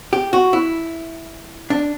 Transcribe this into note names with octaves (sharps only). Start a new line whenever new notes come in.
G4
F#4
E4
D4